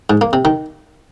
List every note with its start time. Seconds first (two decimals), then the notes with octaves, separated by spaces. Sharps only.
0.10 G#2
0.21 A#3
0.33 C3
0.45 D#3